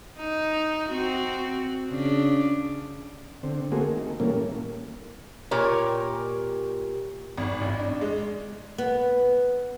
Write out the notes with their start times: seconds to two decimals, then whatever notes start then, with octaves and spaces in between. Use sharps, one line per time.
0.19 D#4
0.90 C4 F#4
1.91 C#3 D4
3.43 D3 C4
3.72 A3 A#3 C4 F#4 G#4
3.90 D#3
4.20 A#2 E3 G3 A3 A#3 C#4
5.51 A#2 G4 A#4 C#5
7.37 G#1
7.61 A1
7.79 D4
8.01 G#3
8.78 B3